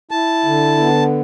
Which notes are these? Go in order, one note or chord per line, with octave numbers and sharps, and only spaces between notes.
E4 A5
D3
B3